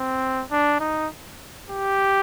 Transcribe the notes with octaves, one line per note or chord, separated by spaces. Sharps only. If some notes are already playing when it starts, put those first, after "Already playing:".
Already playing: C4
D4
D#4
G4